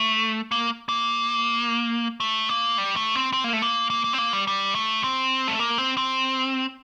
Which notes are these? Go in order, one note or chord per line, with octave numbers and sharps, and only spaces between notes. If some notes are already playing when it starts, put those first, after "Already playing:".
Already playing: A3
A#3
A#3
A3
A#3
G3
A3
C4
C4
A#3
A3
A#3
A#3
A#3
C4
A#3
G3
G3
A3
C4
A3
A#3
C4
C4